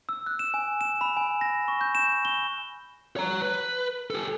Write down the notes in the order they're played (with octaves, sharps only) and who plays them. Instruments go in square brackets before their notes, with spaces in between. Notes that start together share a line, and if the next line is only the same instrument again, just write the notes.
[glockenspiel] E6
F#6
E7
G#5
E7
B5
G#5
A#6
C#6
G6
E7
G7
[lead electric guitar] C#5 A#5
B4
G4 A4